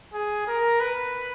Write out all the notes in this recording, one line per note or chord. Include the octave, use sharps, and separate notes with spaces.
G#4
A#4
B4